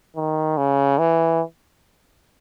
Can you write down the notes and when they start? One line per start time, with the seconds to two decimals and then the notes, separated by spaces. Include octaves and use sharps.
0.16 D#3
0.58 C#3
0.99 E3